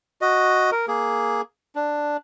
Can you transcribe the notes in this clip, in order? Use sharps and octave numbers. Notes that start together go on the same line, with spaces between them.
F#4 D#5
A#4
A#3 G#4
D4